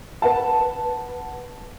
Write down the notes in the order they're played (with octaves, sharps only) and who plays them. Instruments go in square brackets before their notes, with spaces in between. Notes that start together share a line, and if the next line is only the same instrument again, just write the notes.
[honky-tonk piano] B4 F#5 A5